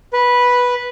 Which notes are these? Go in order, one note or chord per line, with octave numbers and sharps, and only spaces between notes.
B4